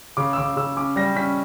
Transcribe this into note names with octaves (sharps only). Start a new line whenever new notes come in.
C#3 D6
E6
C#3 D6
C#3 E6
C#4 D6
G3 A#6
C#4 B6